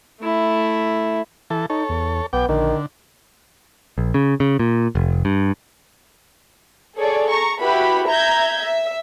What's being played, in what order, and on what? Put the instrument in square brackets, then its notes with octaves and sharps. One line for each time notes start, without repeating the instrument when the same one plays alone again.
[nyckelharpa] A3 E4
[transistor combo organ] E3 A4
[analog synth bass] D#4 [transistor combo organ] A4 C#5
[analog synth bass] E2
[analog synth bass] B1 [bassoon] B3 [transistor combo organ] G5 D6
[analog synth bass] A#1 [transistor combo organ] D3 [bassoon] D#3
[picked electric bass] A#1
C#3
C#3
A#2
F1
G2
[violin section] G#4 A4 C#5 D5
A#5 C#6
E4 F#4 G4 B4 B5
E5 A#5 G6 G#6
E5